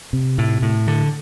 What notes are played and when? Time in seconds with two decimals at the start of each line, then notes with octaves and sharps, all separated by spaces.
0.13 C3
0.38 A2
0.62 A2
0.87 D3